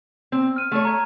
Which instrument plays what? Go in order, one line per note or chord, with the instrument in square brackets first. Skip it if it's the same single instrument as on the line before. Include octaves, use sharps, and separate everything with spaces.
[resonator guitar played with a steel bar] C4
[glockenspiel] F6 D#7
[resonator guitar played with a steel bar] A3 C#5
[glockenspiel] A#5 G#6